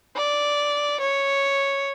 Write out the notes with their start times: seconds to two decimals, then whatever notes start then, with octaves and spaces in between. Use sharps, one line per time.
0.16 D5
1.00 C#5